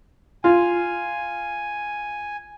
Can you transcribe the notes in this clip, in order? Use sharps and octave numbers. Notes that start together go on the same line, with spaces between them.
F4 G#5